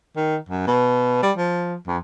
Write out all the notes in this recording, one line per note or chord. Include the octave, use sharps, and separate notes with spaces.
D#3
F#2
B2
G3
F3
F2